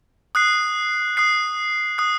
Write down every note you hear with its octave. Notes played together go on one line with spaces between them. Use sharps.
D#6 F#6 C7
D#6 F#6 C7
D#6 F#6 C7